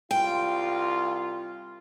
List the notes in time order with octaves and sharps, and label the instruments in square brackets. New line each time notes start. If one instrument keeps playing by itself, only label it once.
[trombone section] C2 F4 [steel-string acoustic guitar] G5